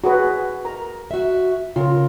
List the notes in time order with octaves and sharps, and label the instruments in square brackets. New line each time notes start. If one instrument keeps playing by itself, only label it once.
[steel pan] F#4 G#4 B4
A#4 A#5
[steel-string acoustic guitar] F#4 E5
[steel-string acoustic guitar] C#3 A#4 [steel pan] F4